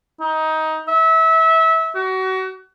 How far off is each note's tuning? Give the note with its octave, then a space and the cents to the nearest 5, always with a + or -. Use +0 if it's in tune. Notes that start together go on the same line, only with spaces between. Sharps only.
D#4 +15
E5 -25
F#4 +30